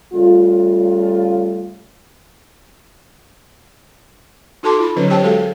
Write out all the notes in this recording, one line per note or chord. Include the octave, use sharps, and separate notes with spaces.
C#3 G3 A3 F4
D#4 F#4 A4 A5 C6 D6
F4 B5
D3 F#3 C#4 B4 C#5
G4 C5 C#5 G5 A5
G#3 F#4 G#4 A4 F5
A#4